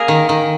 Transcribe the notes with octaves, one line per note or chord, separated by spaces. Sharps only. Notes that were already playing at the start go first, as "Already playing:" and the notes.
Already playing: A#3 G#4 A#4
D#3
D#3